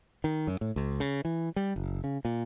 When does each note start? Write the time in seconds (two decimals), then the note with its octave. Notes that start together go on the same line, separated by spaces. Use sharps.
0.24 D#3
0.47 F#2
0.61 A2
0.76 C#2
1.00 C#3
1.25 E3
1.56 G3
1.76 F#1
2.04 C#3
2.25 A#2